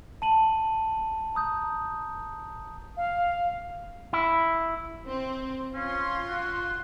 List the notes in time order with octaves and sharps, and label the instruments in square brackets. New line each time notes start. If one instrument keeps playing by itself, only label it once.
[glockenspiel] A5 D#7 F#7
A#5 D#6 G6
[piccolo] F5
[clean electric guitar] E4
[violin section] C4
[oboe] C#4 [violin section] F4 C6
[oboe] F#4